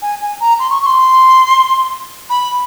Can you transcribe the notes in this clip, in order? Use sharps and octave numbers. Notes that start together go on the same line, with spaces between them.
G#5
G#5
A#5
C6
C#6
C#6
C6
B5